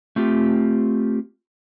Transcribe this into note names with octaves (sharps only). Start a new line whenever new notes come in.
A3 C4 F4 G4